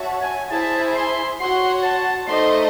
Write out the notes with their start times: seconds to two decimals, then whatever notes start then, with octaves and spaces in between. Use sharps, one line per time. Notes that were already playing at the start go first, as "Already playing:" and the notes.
Already playing: F#4 C#5 E5 A5
0.21 G#5
0.50 E4 G#4 C5 E5 G#5 A5
0.95 C6
1.39 F#4 C#5 F#5 C6
1.83 A5
2.27 A3 D#4 A4 C5 D#5 C6